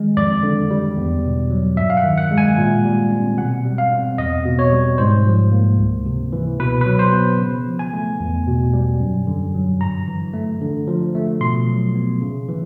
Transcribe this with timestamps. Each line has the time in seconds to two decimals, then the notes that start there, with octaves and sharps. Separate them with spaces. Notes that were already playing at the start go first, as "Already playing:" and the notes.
Already playing: D#3 G#3
0.17 F2 D5
0.43 D3
0.70 G3
0.97 E2
1.24 B2
1.50 F#3
1.77 G2 E5
1.90 F5
1.97 F#5
2.04 D#3
2.18 F#5
2.31 G#3
2.38 G#5
2.58 A#2
2.85 G3
3.11 C4
3.38 B2 F#5
3.65 G3
3.78 F5
3.91 C4
4.18 E2 D#5
4.45 B2
4.59 C#5
4.72 G3
4.98 G#2 C5
5.25 F3
5.52 A#3
5.78 C#2
6.06 C3
6.33 E3
6.60 B2 B4
6.81 F#3 B4
6.99 C5
7.13 B3
7.39 C#3
7.66 F3
7.79 G#5
7.93 A3
8.20 E2
8.47 B2
8.73 G3
9.00 F#2
9.27 D3
9.54 F#3
9.80 G2 A#5
10.08 E3
10.33 A3
10.61 D3
10.87 F3
11.15 A3
11.41 B2 C6
11.69 F#3
11.95 B3
12.21 C#3
12.48 E3